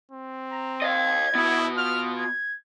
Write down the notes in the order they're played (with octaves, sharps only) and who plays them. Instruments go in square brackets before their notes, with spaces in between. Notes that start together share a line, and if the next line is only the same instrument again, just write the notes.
[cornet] C4
[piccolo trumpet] A#5
[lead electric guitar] D#5 F5 [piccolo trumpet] G#6
[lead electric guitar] B3 F#4 [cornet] E4
[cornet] F4 [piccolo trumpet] F6
[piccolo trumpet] G#6